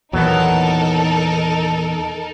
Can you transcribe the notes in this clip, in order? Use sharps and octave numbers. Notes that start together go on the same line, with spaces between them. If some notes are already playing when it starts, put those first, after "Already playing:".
E2 A#2 D#3 F#3 B3 D#4 A4 A#4